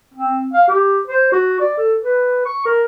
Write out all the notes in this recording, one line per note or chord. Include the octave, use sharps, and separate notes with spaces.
C4
F5
G4
C5
F#4
D5
A4
B4
C#6
A#4